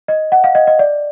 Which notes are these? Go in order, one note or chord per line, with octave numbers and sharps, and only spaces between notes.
D#5
F#5
F5
D#5
D#5
D5